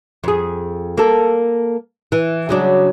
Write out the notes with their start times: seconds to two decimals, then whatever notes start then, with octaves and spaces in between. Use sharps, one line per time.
0.24 F2 G#4
0.97 A#3 A4
2.12 E3
2.49 C#3 F#3 D4